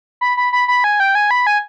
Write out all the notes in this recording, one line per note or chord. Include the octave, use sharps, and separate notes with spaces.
B5
B5
B5
B5
G#5
G5
G#5
B5
G#5